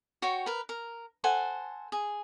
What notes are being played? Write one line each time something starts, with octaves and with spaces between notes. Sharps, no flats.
F#4 C#5 G5
A#4 B4
A#4
A4 C5 F#5 G#5
G#4